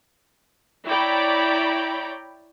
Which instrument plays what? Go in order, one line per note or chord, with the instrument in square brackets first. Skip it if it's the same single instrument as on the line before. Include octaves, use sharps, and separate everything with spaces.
[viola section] E4 C#5 D5 G5 A#5 B5